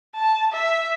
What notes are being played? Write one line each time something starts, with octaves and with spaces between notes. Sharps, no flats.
A5
E5